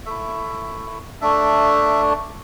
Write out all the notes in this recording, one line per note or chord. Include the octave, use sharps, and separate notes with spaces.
A3 E4 E5
A3 D4 E5